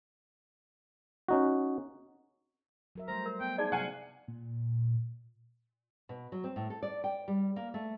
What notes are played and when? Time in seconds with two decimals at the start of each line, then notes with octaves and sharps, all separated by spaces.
1.28 C#4 D#4 F#4
2.95 F#3 A#4 E5
3.08 G3 A3 C5 A#5
3.26 A#4
3.41 B3 G5
3.58 D#4 G#4 D5 G#5
3.72 C3 F#3 F5 F#5 G#5
4.28 A#2
6.09 B2
6.32 F#3
6.44 C4
6.56 A2
6.70 A4
6.83 D5
7.04 G5
7.28 G3
7.56 A#3
7.74 A3